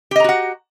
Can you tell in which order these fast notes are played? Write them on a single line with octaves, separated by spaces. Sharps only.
G4 D#5 A#5 F#4 F#5